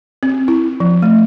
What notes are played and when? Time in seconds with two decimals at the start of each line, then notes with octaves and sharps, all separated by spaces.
0.23 C4
0.48 E4
0.80 F3
1.02 A3